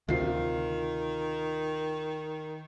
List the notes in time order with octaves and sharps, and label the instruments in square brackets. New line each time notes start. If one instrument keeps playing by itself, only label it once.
[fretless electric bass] D2 C3 [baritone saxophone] D#3 [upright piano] F4 C7